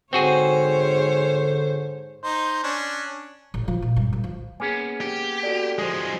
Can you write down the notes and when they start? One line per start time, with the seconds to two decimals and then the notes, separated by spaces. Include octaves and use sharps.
0.13 G#2 D3 C4 F#4 G#4 C5 C#5
2.23 D#4 C5
2.63 C#4 D4
3.54 A1
3.68 F3
3.82 A#2
3.96 G2
4.13 A1
4.24 F3
4.60 A#3 B3 C#4 G#4 G#5
5.01 G4
5.43 F#4 A4 D5
5.78 F3 G#3 G4 G#4 C5